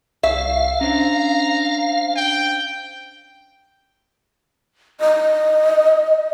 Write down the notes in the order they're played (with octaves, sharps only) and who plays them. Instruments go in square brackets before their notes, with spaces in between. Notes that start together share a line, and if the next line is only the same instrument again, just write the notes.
[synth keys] C2 C#6 [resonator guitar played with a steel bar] E5 [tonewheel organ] F5
[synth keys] C#4 D4 C5 [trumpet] A#5
[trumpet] G5
[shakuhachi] D#5